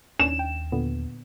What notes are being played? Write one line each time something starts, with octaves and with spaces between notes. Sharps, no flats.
D#2 C#4 D4 E7
G5
A#2 D3 B3